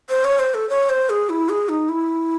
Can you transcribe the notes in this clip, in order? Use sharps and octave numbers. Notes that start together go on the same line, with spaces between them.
C5
C#5
C5
A4
C#5
C5
G#4
E4
G#4
D#4
E4